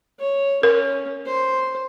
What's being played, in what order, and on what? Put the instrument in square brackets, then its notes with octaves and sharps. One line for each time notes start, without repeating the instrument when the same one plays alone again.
[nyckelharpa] C#5
[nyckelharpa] C#4 [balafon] A#4
[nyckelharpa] C5